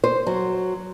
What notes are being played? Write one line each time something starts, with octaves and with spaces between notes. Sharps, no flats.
C5
F#3